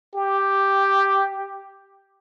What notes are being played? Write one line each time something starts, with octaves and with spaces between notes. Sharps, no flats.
G4